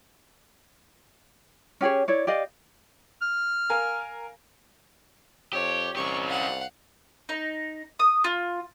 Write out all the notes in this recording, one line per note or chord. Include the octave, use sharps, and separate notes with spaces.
C#4 G4 G#4 C#5
E4 C#5 D5
G4 D5 D#5 F5
F6
A#4 F5 G#5
F2 G4 C#5
C2 C#4 G4 C#6
F5 F#5
D#4
D#6
F4